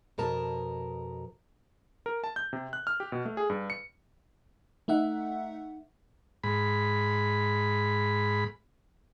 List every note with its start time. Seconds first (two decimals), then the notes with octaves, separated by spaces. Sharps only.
0.18 F2 B2 A#4 A5
2.06 A#4
2.24 A5
2.36 G6
2.53 C3
2.73 F#6
2.87 F6
3.00 G4
3.12 B2
3.25 A3
3.37 G#4
3.50 G2
3.70 C#7
4.88 A3 D#4 E5 F#5
6.44 G#2 B5